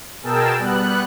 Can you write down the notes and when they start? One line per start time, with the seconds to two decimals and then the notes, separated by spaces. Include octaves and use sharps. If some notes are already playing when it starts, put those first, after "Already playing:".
0.23 B2 G#4 A#4 G5 A5 E6
0.59 G3 B3 F#6